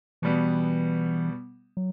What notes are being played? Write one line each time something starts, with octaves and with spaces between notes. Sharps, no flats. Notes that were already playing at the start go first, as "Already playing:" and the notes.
B2 E3 G3 B3
F#3